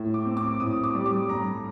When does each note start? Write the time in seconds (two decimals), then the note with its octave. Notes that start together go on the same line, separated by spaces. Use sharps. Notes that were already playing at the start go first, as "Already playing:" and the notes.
Already playing: A2
0.14 D6
0.25 C4
0.37 D6
0.60 A2 D#6
0.84 D6
0.95 G3
1.06 D6
1.28 G2 A#5